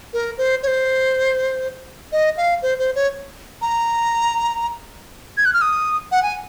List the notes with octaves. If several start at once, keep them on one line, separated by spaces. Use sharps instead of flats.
A#4
C5
C#5
C5
D#5
F5
C5
C5
C#5
A#5
G#6
F#6
F6
D#6
F#5
G#5